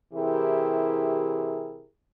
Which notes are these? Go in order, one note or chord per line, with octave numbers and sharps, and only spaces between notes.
C3 E3 E4 G4 G#4 A#4